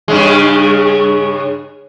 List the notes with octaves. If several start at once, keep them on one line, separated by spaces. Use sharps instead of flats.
G2 C#3 G#3